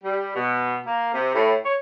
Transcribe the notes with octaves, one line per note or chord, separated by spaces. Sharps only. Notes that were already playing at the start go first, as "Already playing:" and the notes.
G3
B2
A#3
C3
A2
C#5